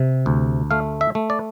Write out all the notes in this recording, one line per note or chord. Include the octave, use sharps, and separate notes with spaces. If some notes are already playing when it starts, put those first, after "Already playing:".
Already playing: C3
D2
A3 F5
E5
A3
D5